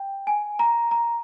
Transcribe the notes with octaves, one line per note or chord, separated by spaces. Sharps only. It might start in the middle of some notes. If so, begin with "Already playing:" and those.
Already playing: G5
G#5
A#5
A#5